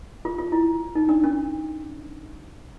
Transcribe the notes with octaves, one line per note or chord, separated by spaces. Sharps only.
F4
F4
E4
D#4
D4
C#4